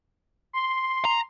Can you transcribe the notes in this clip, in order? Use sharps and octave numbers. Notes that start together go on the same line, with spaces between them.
C6
A#5